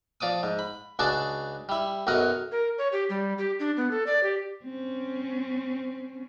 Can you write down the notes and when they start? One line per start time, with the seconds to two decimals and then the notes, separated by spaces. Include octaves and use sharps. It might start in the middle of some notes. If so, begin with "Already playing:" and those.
0.21 F3 D5 D6 D#6
0.43 G#2
0.59 B5
0.99 C#2 D4 F#4 G#4 D5 A5
1.69 G3 E4
2.07 B1 F#2 F#3 A#4 D#5 F#5
2.52 A#4
2.78 C#5
2.92 G4
3.10 G3
3.38 G4
3.60 D4
3.77 B3
3.91 A4
4.06 D5
4.23 G4
4.65 C4 C#4